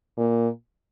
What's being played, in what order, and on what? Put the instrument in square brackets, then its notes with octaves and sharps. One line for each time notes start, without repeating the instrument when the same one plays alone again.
[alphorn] A#2